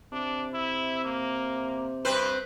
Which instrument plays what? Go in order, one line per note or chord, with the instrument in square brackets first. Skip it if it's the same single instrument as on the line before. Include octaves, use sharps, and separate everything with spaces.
[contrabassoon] C3 [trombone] D4
[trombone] E4
A#3
[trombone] G2 [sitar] C4 B4 C5